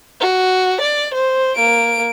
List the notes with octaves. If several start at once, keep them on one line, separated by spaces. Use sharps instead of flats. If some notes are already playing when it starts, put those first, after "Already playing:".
F#4
D5
C5
A#3 D7